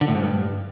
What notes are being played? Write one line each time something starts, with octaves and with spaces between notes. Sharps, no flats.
D3
A2
G#2
G2